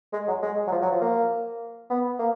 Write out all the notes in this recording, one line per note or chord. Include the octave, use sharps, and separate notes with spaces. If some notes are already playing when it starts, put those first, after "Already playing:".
G#3
F#3
G#3
F#3
F3
F#3
F3
A#3
B3
A#3